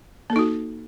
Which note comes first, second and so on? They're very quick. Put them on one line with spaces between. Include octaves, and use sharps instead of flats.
A#3 A4 D#4 F#4